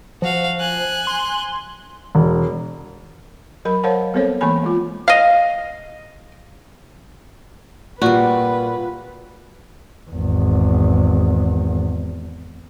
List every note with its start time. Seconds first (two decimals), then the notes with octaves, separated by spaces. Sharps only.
0.22 F3 F#4 F5
0.60 G#5 F#6
1.07 C6
2.15 E1
3.65 F#3 A#4 B5
3.84 A#4 C5 C#5 F5 F#5 A5
4.14 G3 B3 C4 A4 C5 C#5
4.41 E3 G#3 A#3 G#5 B5
4.64 G#3 F4
5.08 D#5 F5
8.02 A#2 G3 F4 F#4 B4
10.10 G#1 E2